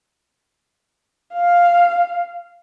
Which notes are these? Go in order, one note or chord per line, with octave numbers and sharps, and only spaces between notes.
F5